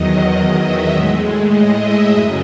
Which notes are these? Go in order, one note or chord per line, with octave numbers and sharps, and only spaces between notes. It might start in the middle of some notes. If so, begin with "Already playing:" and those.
Already playing: E2 D#3 F#3 D#5
E5
A2 G#3
D#5
E5
F#2 C#3 F#3 D#5